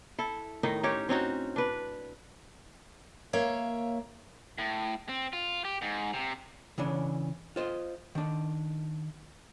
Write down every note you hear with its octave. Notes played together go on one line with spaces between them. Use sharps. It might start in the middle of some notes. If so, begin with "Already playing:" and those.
E4 A4
A2 D#3 D#4
C#4 D#4 G4 C#5
C4 C#4 D#4 F#4
D4 B4
A#3 C#5 E5 F5
A2
C4
F4
G4
G#2
C3
C#3 E3 C#4 D4
F4 C5 D#5
D#3 D4